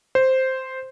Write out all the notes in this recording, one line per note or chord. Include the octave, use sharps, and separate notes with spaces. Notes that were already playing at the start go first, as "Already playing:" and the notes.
C5